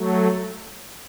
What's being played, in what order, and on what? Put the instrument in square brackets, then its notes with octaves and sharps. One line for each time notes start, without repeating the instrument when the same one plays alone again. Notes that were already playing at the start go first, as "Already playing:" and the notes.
Already playing: [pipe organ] F#3 A3